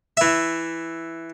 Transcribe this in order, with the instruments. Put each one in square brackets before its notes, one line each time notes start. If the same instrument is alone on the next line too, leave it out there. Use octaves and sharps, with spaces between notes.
[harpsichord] E3 E5